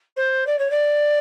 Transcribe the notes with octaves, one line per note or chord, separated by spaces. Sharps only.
C5
D5
C#5
D5